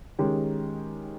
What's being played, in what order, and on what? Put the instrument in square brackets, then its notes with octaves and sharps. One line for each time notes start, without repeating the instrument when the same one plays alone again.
[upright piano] D#3 G#3 C#4 G4